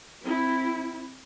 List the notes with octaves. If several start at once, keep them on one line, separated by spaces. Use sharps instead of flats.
C4 E4